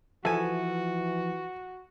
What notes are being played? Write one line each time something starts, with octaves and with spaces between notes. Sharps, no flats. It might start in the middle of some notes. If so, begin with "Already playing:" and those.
E3 F3 F#4 A4 B4 E5 G#5